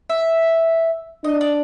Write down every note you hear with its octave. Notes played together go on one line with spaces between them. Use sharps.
E5
D4 D#5
D5